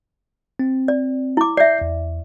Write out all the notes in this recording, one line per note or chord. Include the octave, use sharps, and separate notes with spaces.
C4
D5
E4 D6
D5 E5 G6 C7
E2